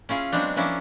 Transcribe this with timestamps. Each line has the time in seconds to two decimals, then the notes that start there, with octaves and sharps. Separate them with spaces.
0.09 C#4 E4 F4 G#4
0.32 F#3 G#3 B3 C4 D4
0.56 F3 A#3 C#4 D4 E4